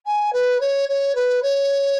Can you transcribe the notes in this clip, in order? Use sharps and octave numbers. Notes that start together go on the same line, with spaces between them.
G#5
B4
C#5
C#5
B4
C#5